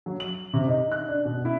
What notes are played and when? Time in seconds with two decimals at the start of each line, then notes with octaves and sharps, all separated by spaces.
0.06 F#3
0.20 F#7
0.53 C3
0.67 D#4
0.92 F#6
1.08 D4
1.25 B2
1.45 E4